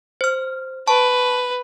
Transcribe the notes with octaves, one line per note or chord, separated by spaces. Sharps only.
C5 F6
B4 A5 C#6